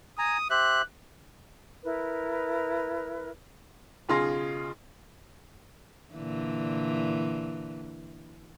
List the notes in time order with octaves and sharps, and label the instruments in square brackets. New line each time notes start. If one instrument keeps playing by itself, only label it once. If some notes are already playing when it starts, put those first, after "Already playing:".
[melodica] G#5 A#5 [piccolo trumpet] D#6
[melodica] G4 C5 E5 [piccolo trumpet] F#6
[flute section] E4 A#4 B4
[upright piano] B1 C#3 F4 G#4 C6 A#6
[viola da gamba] A#2 D3 E3